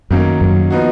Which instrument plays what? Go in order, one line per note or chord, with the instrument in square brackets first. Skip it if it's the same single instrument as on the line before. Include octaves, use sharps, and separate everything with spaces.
[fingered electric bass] F#2 [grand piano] D#3 F#3 A#3 C#4
[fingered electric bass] F#2
[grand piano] F3 B3 D#4 F#4